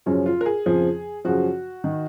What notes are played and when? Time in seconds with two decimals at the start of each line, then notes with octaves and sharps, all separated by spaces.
0.06 F#2 C#3 F3 C#4
0.26 F4
0.41 A#4
0.46 G#4
0.66 F2 C#3 F3
1.25 F#2 C#3 F3 F#4
1.84 D#3